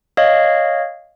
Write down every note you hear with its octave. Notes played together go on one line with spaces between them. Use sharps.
C#5 D#5 F5